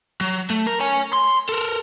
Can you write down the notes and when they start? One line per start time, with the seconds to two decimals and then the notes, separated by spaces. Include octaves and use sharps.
0.21 F#3
0.50 A3
0.67 A#4
0.80 C#5 G#5
1.13 C6
1.49 A4 A#4